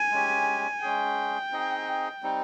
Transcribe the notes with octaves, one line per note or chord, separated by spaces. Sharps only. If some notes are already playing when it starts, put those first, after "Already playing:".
Already playing: G#5
G#3 C#4 G4
G#3 C#4 G#4 G5
C4 D#4 G#4 D#5
G3 C4 D#4